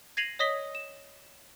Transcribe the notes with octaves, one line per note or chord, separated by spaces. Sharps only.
G#6 A#6 C7 D#7 F7 F#7
C#5 D#5 D#6 A#6 B6 G7
E7